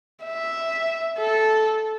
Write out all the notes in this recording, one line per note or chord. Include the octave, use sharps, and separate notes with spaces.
E5
A4